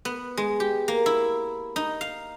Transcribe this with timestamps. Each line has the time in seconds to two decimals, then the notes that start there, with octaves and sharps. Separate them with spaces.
0.05 B3
0.37 G#3
0.60 G4
0.88 A#3
1.06 E4
1.76 D#4
2.01 F5